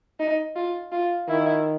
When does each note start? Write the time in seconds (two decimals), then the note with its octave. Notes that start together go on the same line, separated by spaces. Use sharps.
0.19 D#4
0.56 F4
0.92 F4
1.28 D#3 E4